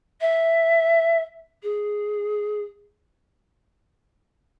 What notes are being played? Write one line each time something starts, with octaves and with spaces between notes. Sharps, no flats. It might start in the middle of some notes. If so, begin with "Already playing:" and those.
E5
G#4